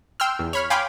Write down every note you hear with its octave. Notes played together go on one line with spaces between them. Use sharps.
G5 C6 E6 F6
E2
C#5 B5 F6
F5 G5 G#5 B5 C6 D6